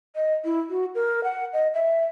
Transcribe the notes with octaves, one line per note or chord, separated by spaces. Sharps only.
D#5
E4
F#4
A#4
F#5
D#5
E5